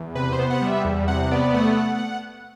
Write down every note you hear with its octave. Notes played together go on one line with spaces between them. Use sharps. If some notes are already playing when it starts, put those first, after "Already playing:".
Already playing: E2
C3 B4
C5
B3
F#5
G3 E5
E2
C3 F#5
B3 D5
A3 F#5